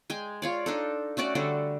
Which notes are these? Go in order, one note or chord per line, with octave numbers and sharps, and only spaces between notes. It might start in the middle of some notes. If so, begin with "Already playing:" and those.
G#3 G5 G#5
F4 C#5 D5
D4 D#4 A4
A3 C#4 F#4 D5
D3 G3 F#4 A4